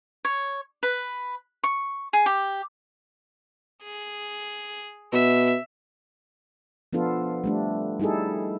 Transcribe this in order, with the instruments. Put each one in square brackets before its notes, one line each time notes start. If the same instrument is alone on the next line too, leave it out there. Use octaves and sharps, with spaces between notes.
[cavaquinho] C#5
B4
C#6
G#4
G4
[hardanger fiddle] G#4
[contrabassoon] B2 [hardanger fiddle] E5
[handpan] F3 B3 D4 F4 A4
G3 A3 D4
G3 D#4 E4 G#4 A4